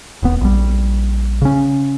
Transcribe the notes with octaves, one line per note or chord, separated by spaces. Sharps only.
D#1 B3
A#1 G3
C#3 C#4